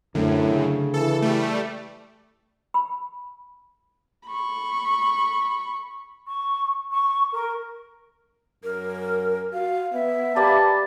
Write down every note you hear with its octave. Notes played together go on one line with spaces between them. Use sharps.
F#2 A2 D3 A3 C4
C#3
E3 A4
G3 A3
B5
B5 C#6
C#6
C#6
A#4
F#2 A#4
F#4 F5
B3 E5
G3 A#3 B4 A5 B5